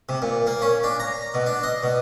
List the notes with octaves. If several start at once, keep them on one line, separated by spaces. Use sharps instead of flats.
C3
A#2
A#3
C#4
D4
A#5
B2
D4
D#5
B2